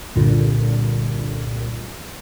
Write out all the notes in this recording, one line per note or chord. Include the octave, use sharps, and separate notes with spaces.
C2 G2 A#2 D3